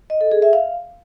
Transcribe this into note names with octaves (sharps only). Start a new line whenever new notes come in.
D#5
A4
G#4
E5
F5